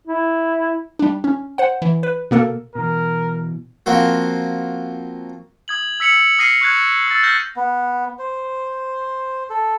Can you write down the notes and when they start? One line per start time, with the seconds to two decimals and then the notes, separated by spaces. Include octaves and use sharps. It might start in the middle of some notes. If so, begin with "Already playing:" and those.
0.07 E4
0.99 G3 D4
1.24 C#4
1.58 C5 F#5
1.82 E3
2.03 B4
2.31 B2 A#3 A4 A#4
2.75 B2 E3 A#4
3.86 F3 A#3 C4 F#4
5.68 D#6 G#6 F#7
6.00 E6 B6 C#7 F7 F#7
6.39 D#6 F6 A#6 C7 C#7 D#7
6.61 C#6 F#6 G#6
7.08 E6 A6
7.23 F6 G6 A#6
7.56 B3
8.19 C5
9.50 A4